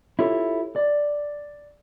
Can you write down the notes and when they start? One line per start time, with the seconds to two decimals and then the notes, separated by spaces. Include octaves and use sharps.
0.19 E4 F4 G4 A4 C#5
0.76 D5